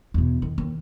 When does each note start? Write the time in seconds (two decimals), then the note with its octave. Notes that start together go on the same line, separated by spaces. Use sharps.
0.14 E2 B2
0.42 D#3
0.58 D#2